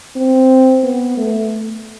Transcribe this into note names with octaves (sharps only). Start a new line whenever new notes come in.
C4
B3
A3